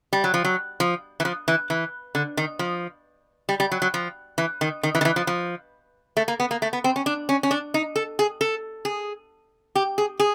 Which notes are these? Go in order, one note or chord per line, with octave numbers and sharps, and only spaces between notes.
G3
F#3
F3
F#3
F3
E3
F3
E3
E3
D3
D#3
F3
G3
G3
F#3
F#3
F3
E3
D#3
D#3
E3
D#3
E3
F3
F3
A3
A#3
B3
A#3
A3
B3
C4
C#4
D4
C#4
C#4
D4
D#4
A4
G#4
A4
G#4
G4
G#4
G#4